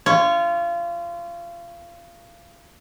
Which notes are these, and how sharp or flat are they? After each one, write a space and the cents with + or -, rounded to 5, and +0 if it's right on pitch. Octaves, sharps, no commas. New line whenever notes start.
F4 -25 C#5 +0